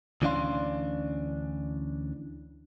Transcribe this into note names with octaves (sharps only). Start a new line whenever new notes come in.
D2 E3 C#4 D4 F5 C6